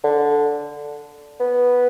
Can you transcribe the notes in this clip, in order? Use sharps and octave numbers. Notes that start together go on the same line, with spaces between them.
D3
B3